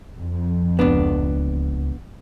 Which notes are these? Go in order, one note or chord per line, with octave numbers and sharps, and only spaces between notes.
F2
D1 C#2 B3 D4